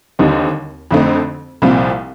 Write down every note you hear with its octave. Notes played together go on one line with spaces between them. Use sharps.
D#2 D3 G3 C4 D#4
F2 D3 A3 C4 D#4
C2 A#2 F3 C4